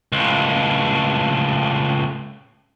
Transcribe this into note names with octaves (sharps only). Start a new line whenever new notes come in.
C#2 A2